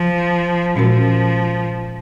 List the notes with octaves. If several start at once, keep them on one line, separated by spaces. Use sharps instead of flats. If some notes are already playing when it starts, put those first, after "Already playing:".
Already playing: F3
A#2 F3 G#3 C#4 F#4 A#4